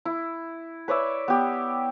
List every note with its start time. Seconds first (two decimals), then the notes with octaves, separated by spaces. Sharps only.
0.05 E4
0.88 B4 C#5 D5 E5
1.28 B3 G4